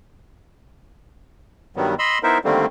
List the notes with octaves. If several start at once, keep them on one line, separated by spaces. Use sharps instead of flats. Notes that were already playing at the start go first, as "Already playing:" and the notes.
G2 D#3 F#3 G3 B3
D#5 B5 C6 E6
B3 D#4 E4 A#4 C5 E5
D3 D#3 G3 A3 A#3 C4